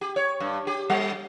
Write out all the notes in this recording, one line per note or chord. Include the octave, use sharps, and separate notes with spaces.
G4
C#5
G2
G4
G3